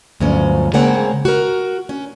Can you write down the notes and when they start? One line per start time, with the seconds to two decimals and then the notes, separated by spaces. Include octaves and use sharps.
0.20 D2 G2 F3 F#3 C#4
0.74 C#3 G#3 A#3 C4 C#5 F#5
1.25 F#4 A#4
1.89 C#4